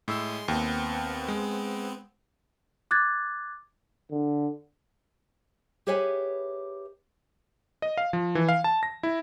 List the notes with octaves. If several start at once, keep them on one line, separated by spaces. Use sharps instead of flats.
A2 G#3 C6 E6
D#2 B3 C4
G#3
D6 F#6 G#6 A6
D3
G4 G#4 B4 C#5 E5 G#5
D#5
F5
F3
E3
F5
A5
A#6
E4